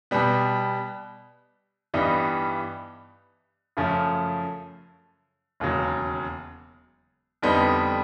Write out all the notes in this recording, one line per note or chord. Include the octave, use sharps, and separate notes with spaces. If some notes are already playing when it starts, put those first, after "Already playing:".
B2 G3 B3
G2 E3 G3 B3 D#4
F#2 C#3 F3 A3 C#4
E1 D#2 C#3 F#3
F2 D3 G3 B3 D#4